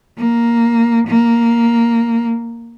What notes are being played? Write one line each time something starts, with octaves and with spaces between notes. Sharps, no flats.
A#3
A#3